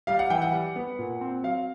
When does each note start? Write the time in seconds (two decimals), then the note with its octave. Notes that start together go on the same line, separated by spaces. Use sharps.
0.07 G3 F5
0.19 F#5
0.30 E3 G5
0.42 F#5
0.53 G3
0.76 B3
0.99 A#2
1.21 C4
1.43 F#3 F5